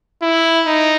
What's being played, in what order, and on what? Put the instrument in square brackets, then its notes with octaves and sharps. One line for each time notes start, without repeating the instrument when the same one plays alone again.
[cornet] E4
D#4